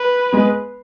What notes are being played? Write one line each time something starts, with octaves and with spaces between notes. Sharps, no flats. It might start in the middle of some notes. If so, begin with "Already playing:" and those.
Already playing: B4
G#3 B3